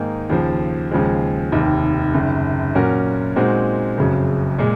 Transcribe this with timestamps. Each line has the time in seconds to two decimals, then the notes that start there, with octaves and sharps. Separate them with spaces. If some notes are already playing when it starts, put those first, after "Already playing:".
Already playing: G#2 D#3 A#3 D#4 G#4
0.30 D#2 C#3 F3
0.91 D#2 C#3 F3 G#3
1.52 F1 D#2 D#3
2.14 F#1 F#2 D#3
2.74 A#2 F#3 C#4 F#4 A#4
3.36 A#2 G#3 C4 D#4 F#4
3.98 F#1 F2 C#3 F#3
4.58 A#2 G#3